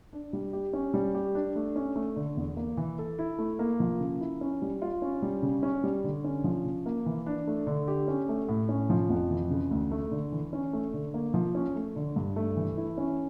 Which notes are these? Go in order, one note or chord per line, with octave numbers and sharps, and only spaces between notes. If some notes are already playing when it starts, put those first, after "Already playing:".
D4
G3
G4
C#4
G3
G4
D4
A3
C#4
A3
D3
E2
A#3
E3
A4
E4
A3
A#3
F3
C#3
E4
C#4
G3
F4
C#4
G3
C#3
C#4
G3
D3
C#4
F3
C#3
A#3
E3
D4
A3
D3
G4
C#4
A3
A2
C#4
F3
F2
E3
C#3
D2
A3
D3
E3
C#4
A3
D3
A#3
F3
C#4
A3
D3
G2
A3
E3
E4
C#4